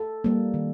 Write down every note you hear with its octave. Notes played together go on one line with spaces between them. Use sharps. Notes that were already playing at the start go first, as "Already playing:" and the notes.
Already playing: A4
G3 A#3
D#3